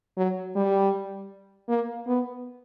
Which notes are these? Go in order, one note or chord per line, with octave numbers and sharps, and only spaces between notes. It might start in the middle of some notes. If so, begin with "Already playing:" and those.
F#3
G3
A#3
B3